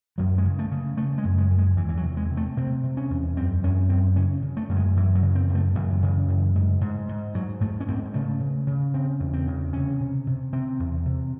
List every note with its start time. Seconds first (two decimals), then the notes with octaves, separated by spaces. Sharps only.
0.18 F#2 F#3
0.38 G#3
0.45 C#3
0.59 A3
0.72 C#3
0.97 C#3 A3
1.18 G#3
1.24 F#2
1.38 G#3
1.50 F#2
1.58 G#3
1.77 E2 E3
1.89 E3
1.97 F#3
2.04 C3
2.17 G#3
2.30 C3
2.37 A3
2.57 C3 C4
2.84 C3
2.97 C#4
3.10 E2
3.37 F#2 C4
3.63 F#2 C#4
3.89 F#2 C4
4.16 C#3 C#4
4.42 C#3
4.57 A3
4.69 F#2
4.76 G#3
4.96 F#2 E3
5.15 F#3
5.22 C#3
5.35 C4
5.49 F#2
5.55 A3
5.75 F#2 E3
6.03 C#3
6.28 F#2
6.55 G#2
6.81 G#2
7.09 G#2
7.34 G#2 F#3
7.61 G#2 A3
7.80 C#4
7.88 G#2 C4
8.14 C#3 A3
8.40 C#3
8.67 C#3
8.94 C#3 C4
9.20 E2
9.33 C4
9.47 C#3
9.73 C3 C#4
10.00 C3
10.27 C3
10.53 C3 C4
10.80 E2
11.06 C3